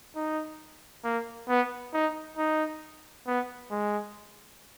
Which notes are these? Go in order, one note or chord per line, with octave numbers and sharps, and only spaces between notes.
D#4
A#3
B3
D#4
D#4
B3
G#3